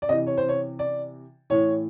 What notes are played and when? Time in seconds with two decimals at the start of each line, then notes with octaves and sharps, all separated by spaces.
0.02 D5
0.09 C3 D#5
0.12 E3
0.27 C#5
0.38 C5
0.49 C#5
0.79 D5
1.50 A2 E3 C#5